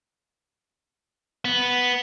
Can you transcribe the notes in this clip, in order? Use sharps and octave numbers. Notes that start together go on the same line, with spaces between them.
B3